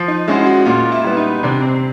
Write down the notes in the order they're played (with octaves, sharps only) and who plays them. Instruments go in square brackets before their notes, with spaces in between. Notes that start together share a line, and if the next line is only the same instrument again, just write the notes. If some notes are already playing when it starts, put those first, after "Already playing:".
Already playing: [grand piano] F3
[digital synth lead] D#4
[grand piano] G#3 C#4 F#4 [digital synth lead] E4
[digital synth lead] F#4
[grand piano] A#2 [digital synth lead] F4
[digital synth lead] E4
[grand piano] G3 B3
[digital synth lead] D#4
[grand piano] C3 [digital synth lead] D4
[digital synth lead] C4